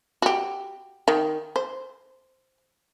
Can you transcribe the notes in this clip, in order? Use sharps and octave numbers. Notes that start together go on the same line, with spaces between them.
F#4 G4
D#3
C5